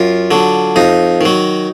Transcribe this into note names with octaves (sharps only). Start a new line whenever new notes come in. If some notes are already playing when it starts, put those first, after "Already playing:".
Already playing: F#2 F4
D3 F#3
F2 D#4
D#3 F#3